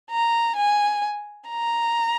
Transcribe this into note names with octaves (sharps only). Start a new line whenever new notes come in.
A#5
G#5
A#5